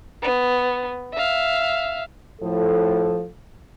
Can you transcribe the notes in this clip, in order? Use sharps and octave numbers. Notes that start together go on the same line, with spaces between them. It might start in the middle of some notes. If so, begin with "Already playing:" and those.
B3
E5 F5
A2 F3 A4